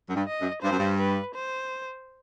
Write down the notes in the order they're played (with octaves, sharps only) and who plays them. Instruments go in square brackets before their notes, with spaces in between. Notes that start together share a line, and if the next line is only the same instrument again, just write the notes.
[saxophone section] F#2
G2
[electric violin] D#5
[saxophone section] F#2
[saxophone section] G2 [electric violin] C5
[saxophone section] F#2
G2
[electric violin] B4
C5